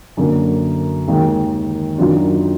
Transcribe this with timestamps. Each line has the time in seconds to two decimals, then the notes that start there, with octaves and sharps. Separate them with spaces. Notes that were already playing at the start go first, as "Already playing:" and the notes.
0.17 F#2 D3 F#3 A#3
1.08 D#2 D#3 G#3
1.98 F#2 D#3 F#3 D4 F4